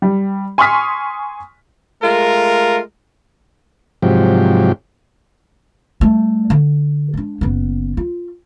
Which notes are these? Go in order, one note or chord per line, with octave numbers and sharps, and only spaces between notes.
G3
G#5 C6 C#6 D#6 F6 B6
G#3 A3 F4 A#4
G#2 C3 F3 F#3 G4
G3 A3
D3
G#3 D4
F#1 B3
F4